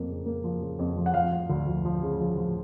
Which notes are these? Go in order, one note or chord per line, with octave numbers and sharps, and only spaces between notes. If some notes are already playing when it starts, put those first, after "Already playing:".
Already playing: F2 A#3
C#3
A#3
F3
C#3
F2
F3
F#5
F3 F5
F3
D2
F3
F3
C#3
F3
F3